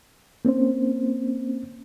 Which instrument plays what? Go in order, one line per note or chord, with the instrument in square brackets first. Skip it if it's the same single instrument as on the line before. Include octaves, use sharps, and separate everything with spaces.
[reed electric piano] A#3 C4 C#4 C5